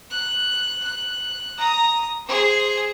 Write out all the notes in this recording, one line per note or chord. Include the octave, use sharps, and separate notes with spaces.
F#6
F#6
A#5 D#6
G#4 C5